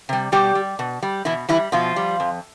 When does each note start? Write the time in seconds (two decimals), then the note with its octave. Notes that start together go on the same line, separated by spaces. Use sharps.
0.09 C3 G3
0.32 B2 G3 G4
0.55 G3
0.79 B2
1.02 G3
1.25 B2 E3 E4
1.49 E3 G3 E4
1.72 B2 F3 F4
1.96 G3
2.20 F2